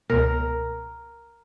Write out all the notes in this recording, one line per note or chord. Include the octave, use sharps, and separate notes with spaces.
C#2 B2 A#4